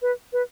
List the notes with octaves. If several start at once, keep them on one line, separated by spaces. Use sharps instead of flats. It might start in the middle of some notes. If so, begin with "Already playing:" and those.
B4
B4